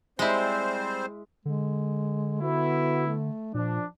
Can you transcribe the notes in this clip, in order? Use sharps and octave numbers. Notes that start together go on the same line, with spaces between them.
G3 G#3 C4 E4 C5
D3 G#3
B3 E4 F#4
A3
A#2 F3 D4